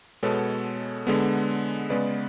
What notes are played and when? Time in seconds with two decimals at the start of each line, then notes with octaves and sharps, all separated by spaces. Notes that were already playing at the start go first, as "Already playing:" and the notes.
0.23 B2 G#3 B3 A4 C#5
1.07 D3 G#3 B3
1.90 C#3 G#3 B3 B4 D5